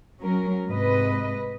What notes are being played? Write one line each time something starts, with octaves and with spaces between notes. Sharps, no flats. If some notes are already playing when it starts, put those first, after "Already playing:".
F#3 C#4 A#4
G#2 C3 B4 D#5